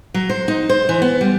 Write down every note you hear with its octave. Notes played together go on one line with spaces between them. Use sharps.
F#3
C5
D#4
C5
E3
B3
G3